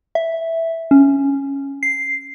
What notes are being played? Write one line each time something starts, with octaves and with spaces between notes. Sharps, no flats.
E5
C#4
C7